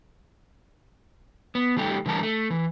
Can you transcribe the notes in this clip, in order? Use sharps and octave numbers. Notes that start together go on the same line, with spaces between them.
B3
D#3 G3 A3 G4
D3 E3 G3 A#4 A5 A#5
A3
E3